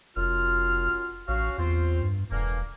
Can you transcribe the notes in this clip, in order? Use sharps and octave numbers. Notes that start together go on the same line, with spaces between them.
F1 F#2 F4 F6
A1 C#4 F#4 F5
E2 C4 F4 C5
G2
E1 D3 E3 A#3